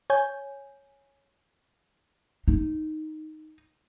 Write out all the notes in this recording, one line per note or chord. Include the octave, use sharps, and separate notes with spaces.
C#5 G#5 G6
D#4